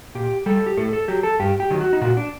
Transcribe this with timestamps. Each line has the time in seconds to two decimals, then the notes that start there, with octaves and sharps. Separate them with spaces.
0.15 A#2 G4
0.46 G3 A4
0.67 G4
0.77 A2 A4
0.93 A4
1.08 F#3 G4
1.23 A4
1.40 G2 G4
1.60 G4
1.71 D#3 F#3
1.81 F#4
1.93 D#4
2.01 A#2 F#4
2.17 D4